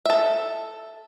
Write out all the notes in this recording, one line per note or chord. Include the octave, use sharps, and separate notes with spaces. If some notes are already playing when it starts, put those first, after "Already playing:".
A4 E5